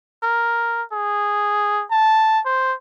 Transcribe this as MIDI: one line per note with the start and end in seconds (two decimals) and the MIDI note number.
0.23 0.82 70
0.92 1.83 68
1.91 2.40 81
2.45 2.74 72